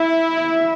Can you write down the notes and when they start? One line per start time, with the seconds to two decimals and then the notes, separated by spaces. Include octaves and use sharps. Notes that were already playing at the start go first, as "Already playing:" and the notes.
Already playing: E4 E5
0.36 E5